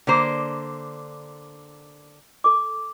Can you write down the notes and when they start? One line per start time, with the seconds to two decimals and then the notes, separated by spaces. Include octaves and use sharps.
0.07 D3 A#3 C5
2.44 A4 D6